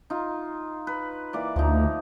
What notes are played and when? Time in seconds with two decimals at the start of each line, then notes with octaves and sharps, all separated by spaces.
0.10 D#4 F4
0.87 B4
1.33 E3 A#3 D5
1.56 D2 F3 A#3 D#4